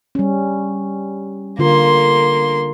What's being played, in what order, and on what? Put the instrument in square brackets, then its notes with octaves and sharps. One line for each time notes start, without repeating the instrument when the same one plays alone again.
[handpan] G3 C#4
[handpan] D3 F4 [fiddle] A#3 C6